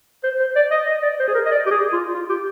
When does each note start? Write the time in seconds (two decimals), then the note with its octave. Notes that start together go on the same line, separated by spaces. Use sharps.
0.24 C5
0.40 C5
0.56 D5
0.71 D#5
0.87 D#5
1.03 D5
1.20 C5
1.28 G#4
1.35 A#4
1.46 D#5
1.51 D5
1.67 G4
1.71 G#4
1.93 F4
2.14 F4
2.30 G4